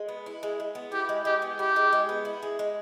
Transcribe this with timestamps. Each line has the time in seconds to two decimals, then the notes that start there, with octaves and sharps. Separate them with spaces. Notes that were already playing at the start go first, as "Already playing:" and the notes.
Already playing: G#3
0.08 B3
0.26 E4
0.43 G#3
0.60 G#3
0.75 B3
0.92 E4 G4
1.09 G#3
1.25 G#3 G4
1.42 B3
1.59 E4 G4
1.76 G#3
1.93 G#3
2.09 B3
2.25 E4
2.43 G#3
2.59 G#3